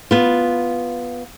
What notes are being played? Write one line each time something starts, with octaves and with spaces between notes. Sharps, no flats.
B3 F4